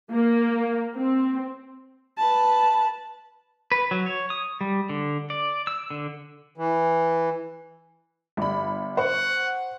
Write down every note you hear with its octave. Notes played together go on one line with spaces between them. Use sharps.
A#3
C4
B4 A5
B4
F#3
C#5
D#6
G3
D3
D5
E6
D3
E3
G1 G3 B5
C5 F#5 C#6